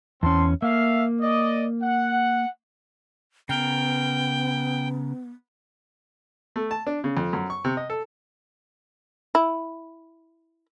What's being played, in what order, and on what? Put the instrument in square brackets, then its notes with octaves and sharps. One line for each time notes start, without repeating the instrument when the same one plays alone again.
[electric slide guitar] E2 C#4 [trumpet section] C4 A5 C6
[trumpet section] A3 E5 F5 [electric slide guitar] A#3
[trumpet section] D5 D#5
F#5
[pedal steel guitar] C#3 A#4 [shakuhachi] B3 [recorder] G5
[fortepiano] A3
A5
D4
C#3
F2
F#2
C#6
C3
D#5
A4
[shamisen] E4